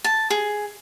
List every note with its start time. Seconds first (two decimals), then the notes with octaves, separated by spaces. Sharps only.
0.04 A5
0.30 G#4